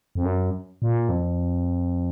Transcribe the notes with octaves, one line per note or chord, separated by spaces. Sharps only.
F2
F#2
A#2
F2